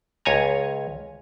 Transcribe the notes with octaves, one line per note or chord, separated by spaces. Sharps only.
C#2 C#5 G#5 A#5